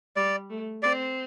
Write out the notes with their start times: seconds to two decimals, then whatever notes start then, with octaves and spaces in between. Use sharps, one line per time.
0.16 G3 D5
0.50 A3
0.82 C4 D5